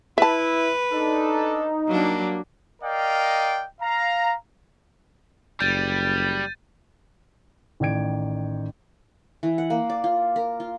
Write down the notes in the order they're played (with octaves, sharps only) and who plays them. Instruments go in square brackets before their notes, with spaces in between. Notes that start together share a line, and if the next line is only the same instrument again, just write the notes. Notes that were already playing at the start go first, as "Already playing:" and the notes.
[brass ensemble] E4 [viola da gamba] B4 [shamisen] E5 A5
[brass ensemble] D4 A4 [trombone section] D#4
[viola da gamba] F#3 D4 [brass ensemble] G3 A#3
[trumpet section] A#4 D5 D#5 F5 G5
F5 A#5
[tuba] F#1 [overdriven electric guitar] G3 [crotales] G6 A6 D#7
[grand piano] A1 D#3 D5 G5 G#6 D7
[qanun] E3
F#5
A#3
D5
F4
A#4
F4